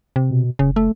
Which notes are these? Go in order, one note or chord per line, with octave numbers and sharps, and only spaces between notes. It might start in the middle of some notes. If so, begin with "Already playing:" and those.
C3
B2
F#1 C#3
A3